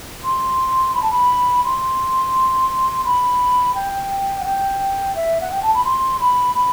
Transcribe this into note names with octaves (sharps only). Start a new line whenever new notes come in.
C6
B5
A5
B5
C6
B5
G5
F#5
G5
E5
F#5
G5
A5
B5
C6
B5
B5